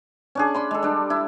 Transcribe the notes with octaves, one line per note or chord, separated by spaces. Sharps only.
C#4 D4 G#4
D5 B5 C6
G#3 A4
G3 D4
E4